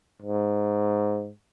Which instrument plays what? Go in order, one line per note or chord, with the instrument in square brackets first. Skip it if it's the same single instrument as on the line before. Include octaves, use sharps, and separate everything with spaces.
[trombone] G#2